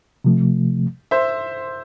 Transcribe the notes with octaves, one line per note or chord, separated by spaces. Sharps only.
C3 F3 A3
C5 E5